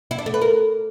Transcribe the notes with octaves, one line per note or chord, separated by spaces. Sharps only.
E4
D4
A3
B4
A#4